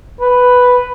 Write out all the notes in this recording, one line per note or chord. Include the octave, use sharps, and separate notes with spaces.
B4